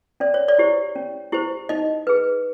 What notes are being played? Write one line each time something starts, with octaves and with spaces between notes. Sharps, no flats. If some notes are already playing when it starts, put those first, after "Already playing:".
C#4 D5
C#5
D5
E4 G4 C5
C#4
E4 G4 C5
D#4 D#5
G#4 B4